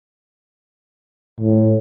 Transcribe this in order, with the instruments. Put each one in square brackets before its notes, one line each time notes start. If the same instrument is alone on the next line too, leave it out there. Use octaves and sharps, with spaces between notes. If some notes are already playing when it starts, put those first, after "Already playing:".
[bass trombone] A2